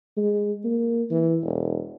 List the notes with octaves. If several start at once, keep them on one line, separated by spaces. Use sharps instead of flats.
G#3
A#3
E3
E1